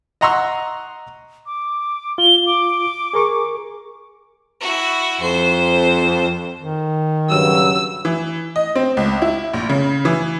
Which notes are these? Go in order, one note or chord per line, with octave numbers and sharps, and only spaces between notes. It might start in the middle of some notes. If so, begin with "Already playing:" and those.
D#5 F#5 A#5 C6 C#6 E6
D6
F4 G7
D6
G#4 A#4 C#6
E4 F#4
F2 C5
D#3
G2 C#3 F#3 E6
E3
D#5
C4
C#2
E4
A#1
C#3
E3